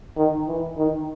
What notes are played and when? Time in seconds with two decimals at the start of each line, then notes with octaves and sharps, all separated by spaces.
0.17 D#3
0.47 E3
0.77 D#3